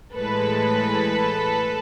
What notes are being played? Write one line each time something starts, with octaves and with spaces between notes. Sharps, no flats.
A2 E3 G#3 A4 B4